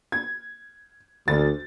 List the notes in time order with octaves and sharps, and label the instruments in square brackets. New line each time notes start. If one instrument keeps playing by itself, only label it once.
[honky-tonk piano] G#6
[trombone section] D2 [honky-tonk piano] A6